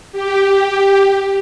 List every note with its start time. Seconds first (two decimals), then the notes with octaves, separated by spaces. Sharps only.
0.12 G4